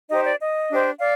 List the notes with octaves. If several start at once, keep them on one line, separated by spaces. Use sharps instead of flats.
D#4 G4 C5 D#5
D5
D#5
D4 G4 C5
D5 F5